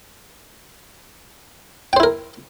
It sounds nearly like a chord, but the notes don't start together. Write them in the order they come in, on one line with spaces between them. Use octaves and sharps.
G5 C5 E4 A#4